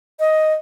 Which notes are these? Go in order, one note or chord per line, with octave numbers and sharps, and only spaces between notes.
D#5